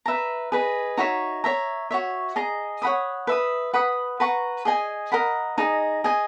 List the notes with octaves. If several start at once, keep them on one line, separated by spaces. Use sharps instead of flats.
B4 E5 A#5
G#4 B4 D#5
D#4 F#4 C#5 E5
C#5 E5 A#5
F#4 C#5 E5
G#4 D#5 A#5
C#5 F#5 B5 D#6
B4 E5 B5 D#6
B4 F#5 B5 D#6
B4 F#5 A#5 C#6
G#4 D#5 G#5
A#4 D#5 F#5 B5
D#4 G#4 D#5
G#4 D#5 G#5